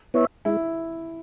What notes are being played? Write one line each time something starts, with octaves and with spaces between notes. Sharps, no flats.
B3 E4 C#5 E5
G#3 E4